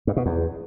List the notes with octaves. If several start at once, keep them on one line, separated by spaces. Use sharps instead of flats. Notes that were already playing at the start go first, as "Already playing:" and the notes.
G2
B2
E2